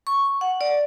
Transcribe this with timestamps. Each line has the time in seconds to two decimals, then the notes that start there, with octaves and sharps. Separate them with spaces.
0.07 C#6
0.41 F#5
0.61 D5